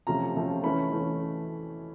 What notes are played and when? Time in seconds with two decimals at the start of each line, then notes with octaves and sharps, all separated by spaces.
0.07 C3 F3 A3 C#4 F4 A#5
0.35 C3 F3 A3 C#4 F4
0.63 E3 A3 C#4 B5
0.92 E3 A3 C#4